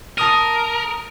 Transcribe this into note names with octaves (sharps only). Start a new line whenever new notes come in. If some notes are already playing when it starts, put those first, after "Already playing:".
A#4 A5 D#6 D#7